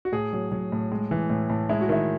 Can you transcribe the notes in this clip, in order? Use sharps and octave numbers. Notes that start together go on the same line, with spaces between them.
F#4
A2 G#4
F#3
F#3
A2
G#3
E3
A2
A2
G#3 E4
F#4
D#3 E4